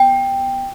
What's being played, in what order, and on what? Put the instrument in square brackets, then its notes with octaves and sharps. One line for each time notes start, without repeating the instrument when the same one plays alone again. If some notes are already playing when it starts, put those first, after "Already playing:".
Already playing: [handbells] B3 G5